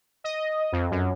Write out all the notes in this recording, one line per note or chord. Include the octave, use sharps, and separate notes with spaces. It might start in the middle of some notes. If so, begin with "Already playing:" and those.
D#5
F2
F#2